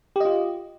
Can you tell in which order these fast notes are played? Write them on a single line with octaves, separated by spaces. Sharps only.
G4 D#5 F4